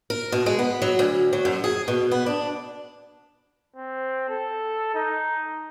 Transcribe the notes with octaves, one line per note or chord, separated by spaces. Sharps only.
A#4
B2
G#3
B3
F#3
D2
F#3
F#2
G#4
B2
B3
D4
C4
A4
D#4